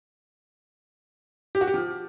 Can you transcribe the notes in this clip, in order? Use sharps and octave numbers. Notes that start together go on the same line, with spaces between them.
G4
F#4
G4
F3